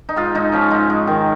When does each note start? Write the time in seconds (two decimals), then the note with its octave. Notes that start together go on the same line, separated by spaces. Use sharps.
0.09 D#4
0.16 G#2 F4
0.35 G#2 D#4
0.52 F3 C#4
0.70 G#2 D#4
0.90 G#2
1.07 D#3